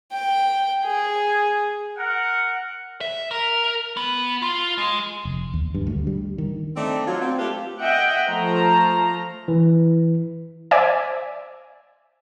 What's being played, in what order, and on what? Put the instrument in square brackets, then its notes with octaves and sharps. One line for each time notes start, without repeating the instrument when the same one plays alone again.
[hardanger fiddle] G5
G#4
[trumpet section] A#4 F#5
[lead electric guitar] E5
A#4
B3
F4
G#3
[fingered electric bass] F1
D#2
G2
D2
G3
D#3
[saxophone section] A3 C4 D4 D#4 D5
F#3 F4
C4
A3 F4 G4 B4
[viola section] D#5 E5 F#5 G5
F3 A3 C5 A#5
[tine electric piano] E3
[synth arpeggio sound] C5 D5 E5 G#5